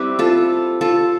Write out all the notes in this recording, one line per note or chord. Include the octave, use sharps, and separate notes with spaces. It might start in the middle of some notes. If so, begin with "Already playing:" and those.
Already playing: G3 C4 E4 G4 B4
F4 A4
F4 A4